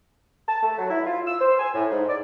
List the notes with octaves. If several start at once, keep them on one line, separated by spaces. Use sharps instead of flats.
A5
A3
F#3
E4
F4
E6
C5
G#5
A2
G#2
D5